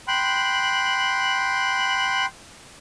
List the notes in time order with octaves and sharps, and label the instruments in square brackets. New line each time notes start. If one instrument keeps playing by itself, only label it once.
[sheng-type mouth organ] G5 B5 C6 F#6